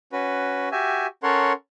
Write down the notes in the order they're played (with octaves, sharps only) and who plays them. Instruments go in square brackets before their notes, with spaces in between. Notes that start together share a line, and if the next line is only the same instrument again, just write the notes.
[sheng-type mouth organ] C#4 F#4 B4
F#4 G4 E5 G#5
C#4 A4 A#4 C#5 F#5 C6